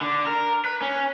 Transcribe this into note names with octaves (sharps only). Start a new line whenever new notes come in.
D3
A#4
B4
C#4